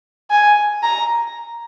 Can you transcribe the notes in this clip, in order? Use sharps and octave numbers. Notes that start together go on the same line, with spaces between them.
G#5
A#5